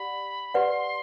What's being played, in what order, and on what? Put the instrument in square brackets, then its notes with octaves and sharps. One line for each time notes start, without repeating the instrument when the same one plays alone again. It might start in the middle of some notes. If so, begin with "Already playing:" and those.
Already playing: [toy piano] G4 D5 F#5 [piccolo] B5
[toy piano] G4 B4 D5 F#5 [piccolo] C6